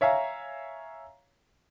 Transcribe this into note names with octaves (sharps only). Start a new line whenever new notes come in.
C#5 E5 F5 G#5 A#5